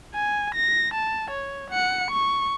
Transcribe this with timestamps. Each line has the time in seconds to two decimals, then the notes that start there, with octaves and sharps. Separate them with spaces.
0.15 G#5
0.55 A#6
0.94 A5
1.31 C#5
1.71 F#5 C#7
2.11 C#6